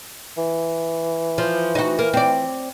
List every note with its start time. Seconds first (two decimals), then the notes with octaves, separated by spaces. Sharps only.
0.38 E3
1.38 F3
1.75 D#4 F#4
1.99 A#3
2.14 C4 D5